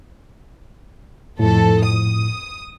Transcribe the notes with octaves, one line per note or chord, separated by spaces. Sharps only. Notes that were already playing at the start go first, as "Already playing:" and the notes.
F2 A2 A4
D#6